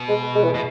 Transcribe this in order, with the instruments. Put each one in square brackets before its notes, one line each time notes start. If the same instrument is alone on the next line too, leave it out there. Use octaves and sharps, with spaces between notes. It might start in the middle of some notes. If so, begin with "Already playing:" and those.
Already playing: [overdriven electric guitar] B2
[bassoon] G#3
G#3
E3
[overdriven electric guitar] B2